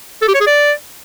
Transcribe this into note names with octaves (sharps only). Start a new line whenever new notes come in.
A4
G4
C#5
G#4
D5